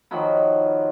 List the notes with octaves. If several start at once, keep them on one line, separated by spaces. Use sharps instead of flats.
D#3 F3 F#3 B5